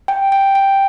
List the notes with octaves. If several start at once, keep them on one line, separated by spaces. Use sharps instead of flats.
G5
G5
G5